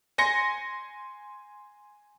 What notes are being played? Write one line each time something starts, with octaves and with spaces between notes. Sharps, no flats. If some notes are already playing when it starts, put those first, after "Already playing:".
G#5 C6 A#6 C#7